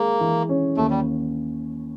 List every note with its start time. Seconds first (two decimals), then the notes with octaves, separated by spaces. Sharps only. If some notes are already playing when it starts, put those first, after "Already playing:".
Already playing: G#3 A#3
0.21 E3
0.49 C#4
0.77 D#2 A3
0.90 G3